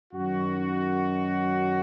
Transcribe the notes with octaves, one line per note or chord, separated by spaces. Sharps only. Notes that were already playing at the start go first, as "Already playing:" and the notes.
F#2 D#3 F#3 F#4